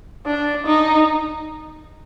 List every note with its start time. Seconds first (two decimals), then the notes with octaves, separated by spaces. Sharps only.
0.27 D4
0.67 D#4